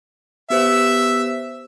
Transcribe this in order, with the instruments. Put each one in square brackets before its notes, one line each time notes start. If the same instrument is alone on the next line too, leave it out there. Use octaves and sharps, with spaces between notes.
[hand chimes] B3 G4 C5 [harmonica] E5